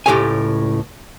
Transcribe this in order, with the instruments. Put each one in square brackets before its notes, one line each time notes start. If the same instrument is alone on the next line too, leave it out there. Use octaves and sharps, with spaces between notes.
[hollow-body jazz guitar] C#2 A2 G4 A4 C#5 G#5